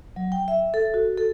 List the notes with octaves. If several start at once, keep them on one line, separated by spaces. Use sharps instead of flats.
F#3
G5
E5
A4
F#4
A4